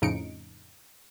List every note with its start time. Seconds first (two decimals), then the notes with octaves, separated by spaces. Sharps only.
0.02 F2 A2 C#3 D#4 C#7 D7